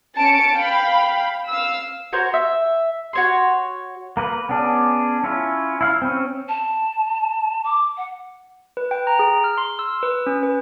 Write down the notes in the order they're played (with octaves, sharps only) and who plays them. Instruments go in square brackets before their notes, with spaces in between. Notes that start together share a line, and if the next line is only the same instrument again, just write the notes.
[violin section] C#4 A5 C#7 D7
F5 G5 B5
F5 E6
[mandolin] F#4 A#4 C5 C#5
E5
F#4 C#5 C6
[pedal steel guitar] A#3 B4
B3 C#4 D4 G#4
C#4 E4 F4
E4 F5
C4 C#4
[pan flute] A5
D6
F#5
[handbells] B4
G5
A#5
G#4
F6
C6
E6
B4
C#4
B4